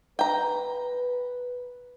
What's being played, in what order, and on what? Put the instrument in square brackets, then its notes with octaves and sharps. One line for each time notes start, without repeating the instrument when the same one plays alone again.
[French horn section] B4 [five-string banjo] G5 A#5